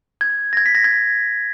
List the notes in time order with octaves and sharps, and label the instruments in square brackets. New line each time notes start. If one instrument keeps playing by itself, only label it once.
[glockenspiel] G#6
A#6
G#6
B6
A#6
G#6